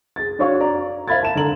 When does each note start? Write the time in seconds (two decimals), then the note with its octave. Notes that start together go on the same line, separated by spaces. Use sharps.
0.16 G#4 A6
0.39 D4 F#4 C#5 F5 C#6
0.60 D5 A#5
1.08 C5 E5 F5 B5 G#6 A6
1.23 A5 E7
1.35 D3 A4 A#5 F#7